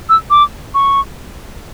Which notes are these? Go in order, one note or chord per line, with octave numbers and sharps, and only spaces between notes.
E6
D6
C#6